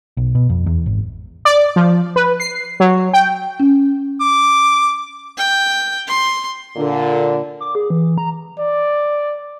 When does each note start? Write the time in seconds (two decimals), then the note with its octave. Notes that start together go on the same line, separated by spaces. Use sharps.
0.17 B1
0.35 B2
0.50 F2
0.66 E2
0.86 G#1
1.45 D5
1.76 F3
2.16 B4
2.40 C7
2.80 F#3
3.13 G5
3.60 C#4
4.20 D6
5.38 G5
6.07 C6
6.76 A#2 D3
7.61 D6
7.75 G#4
7.90 E3
8.18 A#5
8.59 D5